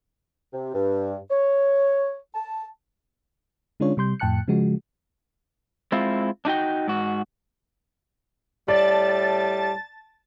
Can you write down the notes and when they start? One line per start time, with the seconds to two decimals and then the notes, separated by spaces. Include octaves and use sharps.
0.53 C3
0.74 G2
1.30 C#5
2.35 A5
3.80 D3 G#3 C#4 D4 F4 C#5
3.97 C3 G3 C6 G6
4.20 F2 A2 G5 A5 F#6 C#7
4.48 C#3 F3 G#3 F#4
5.92 G#3 C4 E4 F4
6.45 D4 D#4 F#4 G5
6.88 G#2 F#4
8.68 A2 G3 D5 A5 A6